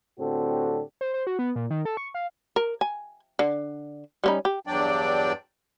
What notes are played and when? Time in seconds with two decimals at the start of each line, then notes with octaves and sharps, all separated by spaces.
0.18 A2 D3 C4 F#4 G4 A4
1.01 C5
1.14 C5
1.27 F#4
1.39 B3
1.56 A#2
1.70 D#3
1.85 A4
1.97 C#6
2.14 F5
2.56 A#4
2.81 G#5
3.39 D3
4.24 G3 C#4 D#4
4.45 G4
4.67 E2 G2 F#3 D4 D5 G5